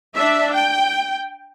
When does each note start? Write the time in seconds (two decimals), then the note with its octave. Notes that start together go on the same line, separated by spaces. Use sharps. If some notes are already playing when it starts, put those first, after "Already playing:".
0.16 D4 E5
0.55 G5